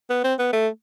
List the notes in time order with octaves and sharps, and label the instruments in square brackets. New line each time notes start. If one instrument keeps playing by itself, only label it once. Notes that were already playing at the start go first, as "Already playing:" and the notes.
[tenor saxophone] B3
C4
B3
A3